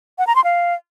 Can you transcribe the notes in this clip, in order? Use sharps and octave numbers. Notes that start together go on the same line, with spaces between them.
F#5
A#5
C6
F5